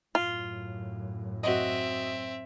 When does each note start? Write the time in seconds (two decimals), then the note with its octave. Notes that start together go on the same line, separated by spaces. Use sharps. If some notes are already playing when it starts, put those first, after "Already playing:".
0.15 F#2 A2 F4
1.43 C4 F#4 D#5 E5